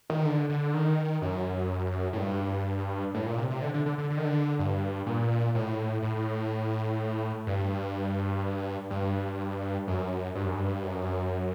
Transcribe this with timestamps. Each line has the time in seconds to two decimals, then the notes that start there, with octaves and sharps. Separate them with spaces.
0.10 D#3
0.25 D3
0.50 D3
0.74 D#3
1.22 F#2
2.13 A2
2.18 G2
3.14 A2
3.26 A#2
3.38 C3
3.50 C3
3.62 D3
3.74 D3
3.86 D3
3.98 D3
4.10 D3
4.17 D#3
4.25 D3
4.59 G2
5.06 A#2
5.55 A2
6.02 A2
7.47 G2
8.90 G2
9.88 F#2
10.35 G2
10.45 F#2
10.55 G2
10.83 F#2